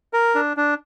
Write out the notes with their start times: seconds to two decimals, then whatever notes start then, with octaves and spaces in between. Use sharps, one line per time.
0.13 A#4
0.35 D4
0.57 D4